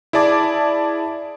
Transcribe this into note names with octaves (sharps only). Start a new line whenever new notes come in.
E4 G#4 D5 A5 D6